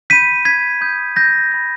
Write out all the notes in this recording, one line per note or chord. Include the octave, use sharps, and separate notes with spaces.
B5 G6 B6 D#7
G#6 B6
B5 D#6 G6
G6 A#6
B5 G6